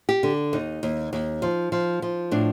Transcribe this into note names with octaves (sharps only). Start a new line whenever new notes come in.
G4
D3
D#2 D#4
D#2
D#2
F3
F3
F3
A2 D4